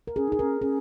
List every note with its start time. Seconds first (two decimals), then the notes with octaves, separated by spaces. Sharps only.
0.07 A#4
0.16 C#4 G#4
0.29 D#4 G#4
0.39 C#4 A#4
0.61 C#4 G#4